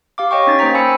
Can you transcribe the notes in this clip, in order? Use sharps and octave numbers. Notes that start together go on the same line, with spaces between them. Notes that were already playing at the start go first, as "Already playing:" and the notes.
G4 F5 D6
C#5 D#5 G5 C#6
C#4 D#4 A6
A#3 C5 G5 A#5 B6
G5 G#5 B5 E6 C#7